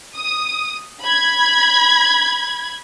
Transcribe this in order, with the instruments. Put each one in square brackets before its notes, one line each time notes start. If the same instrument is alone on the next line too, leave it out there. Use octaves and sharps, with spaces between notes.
[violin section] D#6
B5 G#6